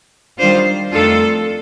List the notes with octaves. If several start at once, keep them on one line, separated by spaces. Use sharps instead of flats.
D#3 G3 D4 F4 C5
F2 D#3 A3 D4 F4 A4